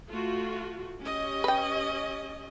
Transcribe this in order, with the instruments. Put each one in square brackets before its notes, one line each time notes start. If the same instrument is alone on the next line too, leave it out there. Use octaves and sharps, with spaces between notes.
[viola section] A3 F4 F#4
C#4 G4 D#5
[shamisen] B4 G5